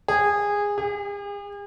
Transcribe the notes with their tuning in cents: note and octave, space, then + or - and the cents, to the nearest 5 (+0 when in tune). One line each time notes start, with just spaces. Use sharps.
G#4 -20
G#4 -45